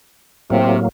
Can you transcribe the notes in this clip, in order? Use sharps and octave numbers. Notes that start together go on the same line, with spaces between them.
A2 C3 F#3 A#3